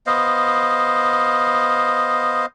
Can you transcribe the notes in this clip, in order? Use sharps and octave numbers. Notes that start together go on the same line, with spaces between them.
B3 C5 D#5 F5